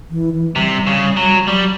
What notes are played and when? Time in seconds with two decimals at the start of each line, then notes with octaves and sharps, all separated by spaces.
0.10 E3
0.34 E3
0.56 C3 G3
0.87 C#3
1.17 F#3
1.47 F#3 G3